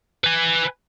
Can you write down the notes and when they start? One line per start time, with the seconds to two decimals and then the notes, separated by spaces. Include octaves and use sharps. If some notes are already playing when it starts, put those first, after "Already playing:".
0.24 B4 G#5